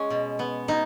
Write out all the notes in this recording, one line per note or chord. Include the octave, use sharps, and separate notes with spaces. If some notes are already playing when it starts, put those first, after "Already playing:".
Already playing: G#3 C#4
B2
B3
B2 D#4